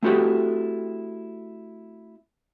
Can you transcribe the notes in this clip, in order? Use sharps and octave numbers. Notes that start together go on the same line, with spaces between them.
A3 C4 E4 F#4 G4 A4